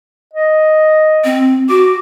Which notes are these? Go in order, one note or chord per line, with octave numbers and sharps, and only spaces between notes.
D#5
C4
F#4 D6